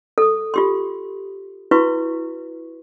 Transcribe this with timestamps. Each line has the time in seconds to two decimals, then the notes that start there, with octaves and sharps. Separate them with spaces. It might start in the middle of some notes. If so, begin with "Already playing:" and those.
0.18 A4 D#6
0.54 F4 G4 C6
1.71 E4 F#4 B4 C#6